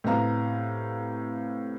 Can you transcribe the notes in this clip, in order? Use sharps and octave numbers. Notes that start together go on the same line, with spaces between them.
A2 C3 B3 F5 A#5